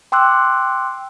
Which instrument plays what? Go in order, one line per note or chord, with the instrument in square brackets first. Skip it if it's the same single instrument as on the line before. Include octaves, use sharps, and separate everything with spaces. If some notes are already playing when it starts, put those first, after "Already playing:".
[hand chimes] G5 C6 D6 E6 F#6